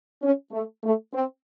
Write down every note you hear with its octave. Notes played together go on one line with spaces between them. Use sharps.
C#4
A3
A3
C4